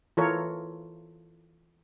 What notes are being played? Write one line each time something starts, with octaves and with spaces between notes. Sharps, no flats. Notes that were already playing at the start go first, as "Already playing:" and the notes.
E3 F4 A4 A#4 C#5